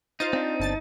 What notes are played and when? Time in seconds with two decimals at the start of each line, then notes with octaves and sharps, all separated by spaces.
0.20 D#4 F4 C5 A6
0.33 C4 D4
0.60 G1 A5 A6